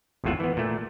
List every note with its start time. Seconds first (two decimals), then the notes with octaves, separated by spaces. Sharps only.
0.24 G#1 E2 A2 F4 E5 F#5
0.40 E3 B3
0.57 A#2 A3